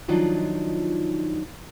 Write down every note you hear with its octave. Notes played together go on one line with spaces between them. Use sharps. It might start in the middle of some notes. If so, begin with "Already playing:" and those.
D#3 F3 F#3 D4 D#4 F4